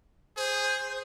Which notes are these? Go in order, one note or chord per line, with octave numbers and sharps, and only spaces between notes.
G#4 C5